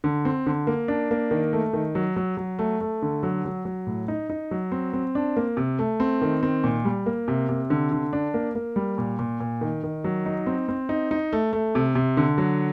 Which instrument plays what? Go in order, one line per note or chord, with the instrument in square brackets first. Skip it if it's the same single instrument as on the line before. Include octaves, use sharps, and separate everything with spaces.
[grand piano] D3
C4
D3
A#3
D4
A#3
D#3
A3
D#3
F#3
F#3
F#3
A3
A3
D3
F#3
F#3
F#3
A2
D#4
D#4
F#3
C4
C4
D4
A#3
C3
A3
C4
D#3
C4
A#2
G3
A#3
C3
C3
D3
D3
D4
A#3
A#3
G3
A#2
A#2
A#2
D#3
D#3
F#3
D#4
C4
C4
D#4
D#4
A3
A3
C3
C3
D3
F#3